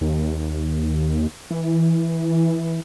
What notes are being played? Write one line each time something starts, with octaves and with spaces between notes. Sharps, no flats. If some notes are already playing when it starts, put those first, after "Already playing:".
D#2
E3